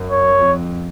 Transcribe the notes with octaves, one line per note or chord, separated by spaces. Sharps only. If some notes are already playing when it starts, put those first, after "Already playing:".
Already playing: F#2
C#5
F2